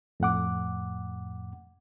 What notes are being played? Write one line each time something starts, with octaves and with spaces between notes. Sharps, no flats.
F2 A2 F#5 D6